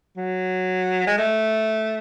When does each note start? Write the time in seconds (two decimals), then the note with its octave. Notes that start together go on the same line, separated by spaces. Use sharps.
0.17 F#3
1.07 G#3
1.18 A3